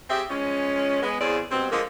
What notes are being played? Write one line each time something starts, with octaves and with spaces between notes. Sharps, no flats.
C4 G4 G#4 E5
F3 G#3 C#4
G#3 B3
E2 C#3 C4 G#4 D5
G2 B2 C4
D3 F3 G#3 A#3